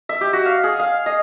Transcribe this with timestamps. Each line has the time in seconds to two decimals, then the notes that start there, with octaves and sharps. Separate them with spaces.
0.09 E5
0.21 G4
0.33 F#4
0.45 F5
0.64 G#4
0.80 F5
1.06 D#5